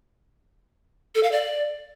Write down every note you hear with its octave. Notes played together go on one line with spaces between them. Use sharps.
A4
F5
D5